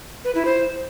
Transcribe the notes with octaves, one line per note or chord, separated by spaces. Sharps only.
B4
E4
C5